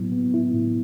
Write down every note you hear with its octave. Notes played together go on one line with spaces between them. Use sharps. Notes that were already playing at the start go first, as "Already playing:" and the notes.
Already playing: A2 F#3 B3 E4
B3
E4
A2